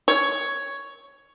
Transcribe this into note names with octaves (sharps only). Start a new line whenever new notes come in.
C#5